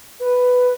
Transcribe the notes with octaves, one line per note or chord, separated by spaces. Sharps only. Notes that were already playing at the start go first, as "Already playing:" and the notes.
B4